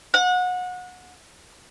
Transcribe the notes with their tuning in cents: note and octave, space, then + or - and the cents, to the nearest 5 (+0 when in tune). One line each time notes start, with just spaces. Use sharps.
F#5 -30